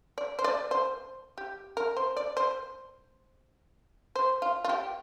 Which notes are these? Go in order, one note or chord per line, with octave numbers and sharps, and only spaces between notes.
D5
C5
D5
C5
G4
A#4
C5
D5
C5
C5
F4
F4
G4